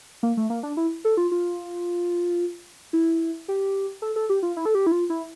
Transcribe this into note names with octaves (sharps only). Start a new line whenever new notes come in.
A#3
A3
A#3
D4
E4
A4
F4
F4
E4
G4
A4
A4
G4
F4
E4
A4
G4
E4
F4
E4